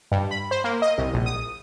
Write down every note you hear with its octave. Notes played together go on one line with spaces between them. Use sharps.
G2
B5
C5
A#3
D#5
C2
A#1
D#6